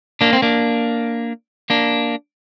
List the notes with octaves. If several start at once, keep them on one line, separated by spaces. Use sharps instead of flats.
A#3 D4
C4
A#3 D4
A#3 D4